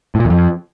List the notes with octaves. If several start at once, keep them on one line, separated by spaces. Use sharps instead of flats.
A2
A#2
E2
F2